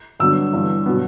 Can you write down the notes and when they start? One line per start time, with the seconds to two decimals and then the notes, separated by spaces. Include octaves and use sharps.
0.20 G2 D3 F#3 B3 E6
0.53 G2 E3 B3
0.86 B2 F#3 B3